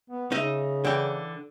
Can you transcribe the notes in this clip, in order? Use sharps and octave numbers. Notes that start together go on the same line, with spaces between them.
B3
C#3 D#4 D#5 E5
D3 E3 G5